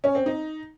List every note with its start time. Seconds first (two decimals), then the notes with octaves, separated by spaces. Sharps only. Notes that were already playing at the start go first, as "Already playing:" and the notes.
0.04 C#4
0.15 C4
0.26 D#4